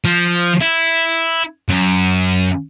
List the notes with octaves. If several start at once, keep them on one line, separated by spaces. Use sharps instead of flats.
F3
E4
F#2